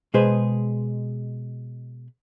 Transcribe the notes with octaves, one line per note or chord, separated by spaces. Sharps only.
B2 G#3 G#4 B4 C5